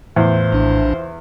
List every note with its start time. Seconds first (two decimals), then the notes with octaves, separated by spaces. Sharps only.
0.16 E2 A2 E4 F4 C5
0.52 A#1 D4